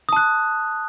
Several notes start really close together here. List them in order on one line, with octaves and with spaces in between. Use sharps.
D#6 A5 F#6